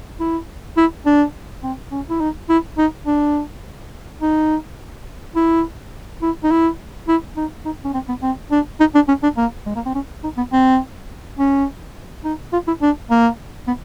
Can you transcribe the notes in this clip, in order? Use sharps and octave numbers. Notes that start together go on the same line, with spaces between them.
E4
E4
D4
C4
C#4
E4
D#4
E4
D#4
D4
D#4
E4
E4
D#4
E4
E4
D#4
D#4
C#4
C4
B3
C4
D4
D#4
D4
C#4
D4
A#3
G#3
A#3
C4
C#4
D#4
B3
C4
C#4
D#4
F4
E4
D4
A#3
B3